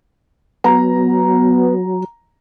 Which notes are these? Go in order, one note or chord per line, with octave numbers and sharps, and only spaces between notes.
F#3 B3 A#5